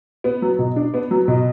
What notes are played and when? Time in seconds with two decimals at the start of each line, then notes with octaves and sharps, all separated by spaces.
0.24 B3
0.42 F#3
0.59 B2
0.76 D4
0.94 B3
1.11 F#3
1.28 B2